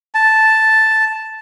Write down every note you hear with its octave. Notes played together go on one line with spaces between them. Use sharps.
A5